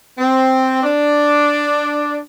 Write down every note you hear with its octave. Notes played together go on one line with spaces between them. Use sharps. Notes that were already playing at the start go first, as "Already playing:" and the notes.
C4
D4